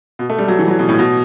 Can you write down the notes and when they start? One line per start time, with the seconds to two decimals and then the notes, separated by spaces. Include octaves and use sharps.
0.19 B2
0.29 A3
0.38 G3
0.48 F#3
0.59 E3
0.68 F#3
0.79 B2
0.89 A2
0.99 B2